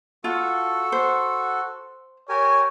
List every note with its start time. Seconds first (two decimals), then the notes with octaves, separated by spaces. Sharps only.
0.24 F4 F#4 A4
0.92 C5
2.29 G4 A#4 C#5 G#5